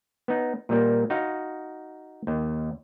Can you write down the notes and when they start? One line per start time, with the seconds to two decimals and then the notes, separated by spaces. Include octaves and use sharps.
0.28 B3 D#4
0.69 A#2 G3 A#3
1.10 D#4 F#4 D#5 F5
2.27 D#2